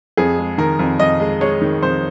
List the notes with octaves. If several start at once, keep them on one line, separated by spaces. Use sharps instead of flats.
F2 G#4
G#3
D#3 A#4
F2
F2 D#5
G#3
G#3 C#5
D#3
F2 C5